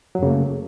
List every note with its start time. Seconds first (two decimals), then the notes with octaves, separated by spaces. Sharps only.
0.15 F#3
0.19 F#2
0.23 C#3
0.26 A#3
0.30 A3